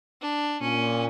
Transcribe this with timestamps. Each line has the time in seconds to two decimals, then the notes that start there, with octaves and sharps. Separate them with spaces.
0.22 D4
0.61 A#2 C#4